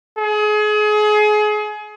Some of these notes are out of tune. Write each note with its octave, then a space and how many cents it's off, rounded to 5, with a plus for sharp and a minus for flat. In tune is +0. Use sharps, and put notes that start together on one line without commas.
G#4 +30